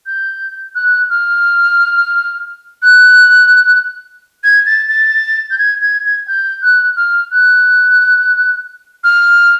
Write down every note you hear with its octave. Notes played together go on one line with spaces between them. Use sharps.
G6
F#6
F6
F#6
G#6
A6
A6
G6
G#6
G#6
G#6
G6
F#6
F6
F#6
F6